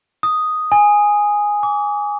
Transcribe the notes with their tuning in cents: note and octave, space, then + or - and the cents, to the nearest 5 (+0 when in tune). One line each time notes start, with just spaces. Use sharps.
D#6 +0
G#5 -5
D6 -35